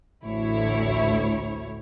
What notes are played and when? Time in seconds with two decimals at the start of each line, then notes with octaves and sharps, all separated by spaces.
0.23 A1 D2 A2 E4 C#5